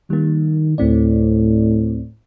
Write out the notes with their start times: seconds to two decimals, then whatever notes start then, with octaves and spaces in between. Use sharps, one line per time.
0.10 D#3 G3 A#3
0.78 D2 A2 C4 D5